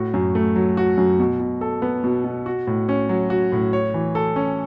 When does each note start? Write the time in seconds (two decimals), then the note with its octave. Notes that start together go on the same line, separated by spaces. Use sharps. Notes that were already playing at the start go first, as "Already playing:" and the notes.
Already playing: A2 F#4
0.14 F#2
0.35 A3
0.56 F#3
0.77 F#4
0.97 F#2
1.19 B2
1.40 B2
1.61 A4
1.82 B3
2.04 B2
2.24 B2
2.46 F#4
2.67 A2
2.89 C#4
3.09 F#3
3.30 F#4
3.52 A2
3.73 C#5
3.94 E3
4.15 A4
4.36 C#4